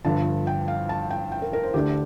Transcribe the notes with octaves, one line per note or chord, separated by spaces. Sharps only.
G1 G2 D3 F3 A5
G5
F5
A5
G5
G5
A#4
A#4
C5
D2 D3 A3 D4 G4